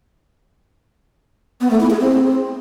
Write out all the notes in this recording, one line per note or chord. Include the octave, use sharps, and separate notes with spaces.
B3
A3
E4
G#4
C4